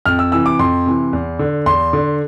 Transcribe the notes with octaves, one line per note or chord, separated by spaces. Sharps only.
F2 F6
E6
C3 E3 E6
D6
F2 C6
C3 E3
E2
D3
E2 C6
D3